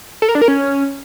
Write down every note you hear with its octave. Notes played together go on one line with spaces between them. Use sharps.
A4
A#4
D4
A#4
C#4